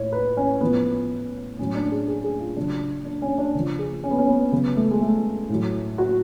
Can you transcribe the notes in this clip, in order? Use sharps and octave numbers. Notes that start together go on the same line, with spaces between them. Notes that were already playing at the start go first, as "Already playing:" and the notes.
Already playing: A2 C#5
B4
C#4
A2 F3 B3
A2 F#3 C#4
D4
G#4
G#4
G#4
F4
C#3 F#3 D4
D4
C#4
D4
C#3 F3
G#4
C#4
B3
C#4
B3
C#3 F#3 B3
A3
G#3
A3
A2
F#3
F#4